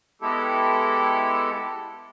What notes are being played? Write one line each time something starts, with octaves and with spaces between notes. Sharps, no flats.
G#3 B3 E4 G4 A4